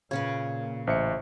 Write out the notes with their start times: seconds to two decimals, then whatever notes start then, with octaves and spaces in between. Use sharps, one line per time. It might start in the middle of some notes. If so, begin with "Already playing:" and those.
0.11 A#2 C#3 C#4 B4 G#6
0.87 A1 C5 E5 C#7